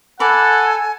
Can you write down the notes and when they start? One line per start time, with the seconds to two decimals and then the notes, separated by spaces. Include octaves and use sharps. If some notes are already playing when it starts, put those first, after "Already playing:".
0.20 A4 F#5 G#5 B5 D6